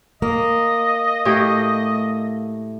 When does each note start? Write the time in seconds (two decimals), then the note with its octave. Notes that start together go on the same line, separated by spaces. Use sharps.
0.22 A#3 D#5
1.25 A2 G4